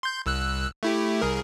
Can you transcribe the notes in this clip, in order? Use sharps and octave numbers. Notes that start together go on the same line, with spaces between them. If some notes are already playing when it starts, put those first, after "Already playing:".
C6 G6
C2 E6 F#6
A3 E4 G4
C2 G#4 A#4